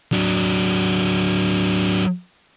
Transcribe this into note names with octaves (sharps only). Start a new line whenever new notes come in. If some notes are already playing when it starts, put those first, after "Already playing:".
F#3 D4